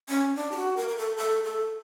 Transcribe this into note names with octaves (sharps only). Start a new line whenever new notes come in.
C#4
D4
G4
F#4
A#4
A#4
A4
A4
A4